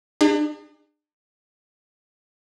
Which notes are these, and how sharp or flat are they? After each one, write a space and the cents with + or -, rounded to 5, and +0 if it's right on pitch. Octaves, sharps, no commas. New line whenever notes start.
D4 +40 G#4 -35